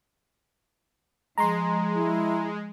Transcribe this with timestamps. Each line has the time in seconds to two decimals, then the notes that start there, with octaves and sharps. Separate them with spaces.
1.38 F3 G#3 A#5 C6
1.95 E4